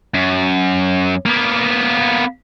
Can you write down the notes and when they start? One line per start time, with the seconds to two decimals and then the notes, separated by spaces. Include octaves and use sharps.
0.15 F#2
1.26 A#3 B3